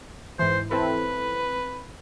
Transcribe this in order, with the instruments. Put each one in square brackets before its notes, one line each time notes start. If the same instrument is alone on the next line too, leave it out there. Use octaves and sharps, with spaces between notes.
[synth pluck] G#2 E3 [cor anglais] C5
[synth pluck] C4 E4 A4 [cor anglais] B4